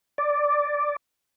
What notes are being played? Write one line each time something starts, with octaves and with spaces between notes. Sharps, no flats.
D5